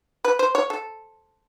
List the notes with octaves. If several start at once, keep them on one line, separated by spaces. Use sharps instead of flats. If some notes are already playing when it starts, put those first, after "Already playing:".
B4
C5
C#5
A4